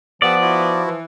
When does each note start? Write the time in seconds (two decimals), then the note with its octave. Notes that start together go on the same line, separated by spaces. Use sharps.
0.22 F3 B3 G4 D5 F#5 E6
0.41 E4 F#4
0.87 E3